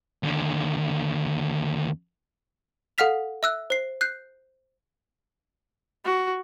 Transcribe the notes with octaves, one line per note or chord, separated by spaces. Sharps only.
D#2 D3
A4 F5 F#5 F6 B6 F7
E5 E6 F#6
C5 C7
F#6 G6 C7
F#4